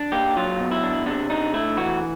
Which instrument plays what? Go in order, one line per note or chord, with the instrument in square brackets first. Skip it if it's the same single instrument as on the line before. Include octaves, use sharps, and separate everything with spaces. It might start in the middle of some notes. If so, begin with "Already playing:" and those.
Already playing: [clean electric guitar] D4
A#3 G4
F#3 F4
B2
E4
D4
C3 D4
D4 D#4
A3 E4
E3 F#4